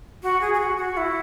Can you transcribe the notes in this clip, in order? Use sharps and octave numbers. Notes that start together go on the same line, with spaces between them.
F#4
G#4
G#4
F#4
F#4
E4